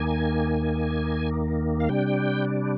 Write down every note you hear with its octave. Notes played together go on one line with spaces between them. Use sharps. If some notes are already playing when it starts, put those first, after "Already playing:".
Already playing: D#2 D#3 A#3 G#5
F5
C3 G3 D4 G5